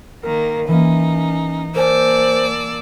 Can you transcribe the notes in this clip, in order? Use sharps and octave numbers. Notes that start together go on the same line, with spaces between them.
D#3 A#3 A#4
E3 A#3 C#4 D#4
A#3 A#4 C5 D5 G#5 A5 E6